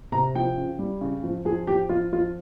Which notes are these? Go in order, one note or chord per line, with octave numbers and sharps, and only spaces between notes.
C3 A#5
F3 G5
C#3
G3
C#3
F2
F2 G#4
F2 G4
F2 F4
F2 F4